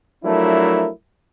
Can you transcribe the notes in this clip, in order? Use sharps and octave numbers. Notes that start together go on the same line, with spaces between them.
F3 F#3 A3 D4 E4 A#4